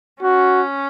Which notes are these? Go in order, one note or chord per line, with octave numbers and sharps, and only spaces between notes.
C#4 F#4